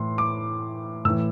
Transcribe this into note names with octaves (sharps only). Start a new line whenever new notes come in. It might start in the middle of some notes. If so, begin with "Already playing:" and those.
Already playing: A2 E3 C6
D6
A2 E3 E6